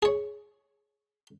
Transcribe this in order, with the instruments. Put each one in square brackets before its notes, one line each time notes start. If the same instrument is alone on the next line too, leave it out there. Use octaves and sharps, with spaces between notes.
[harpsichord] G#4 C#5